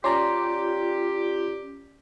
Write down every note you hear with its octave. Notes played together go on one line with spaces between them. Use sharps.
C#4 F4 G4 D5 A#5 C6